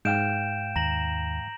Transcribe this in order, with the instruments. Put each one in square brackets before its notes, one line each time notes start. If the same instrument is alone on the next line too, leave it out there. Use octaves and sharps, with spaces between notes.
[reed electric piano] G#2 F5 G5 [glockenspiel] G6 D7 E7
[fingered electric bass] D#2 [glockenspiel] A#5 A#6 F#7